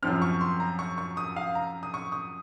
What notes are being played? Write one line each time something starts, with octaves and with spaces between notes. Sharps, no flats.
F#2 F3 C4 F6
C#6
C6
A#5
C#6
C#6
D#6
F5
A#5
D#6
C#6
D#6